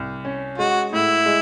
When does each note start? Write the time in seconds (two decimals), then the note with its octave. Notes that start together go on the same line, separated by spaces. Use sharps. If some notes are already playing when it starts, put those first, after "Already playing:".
Already playing: C2
0.25 C#4
0.58 G#3 F#4
0.92 A2 E4
1.26 G#3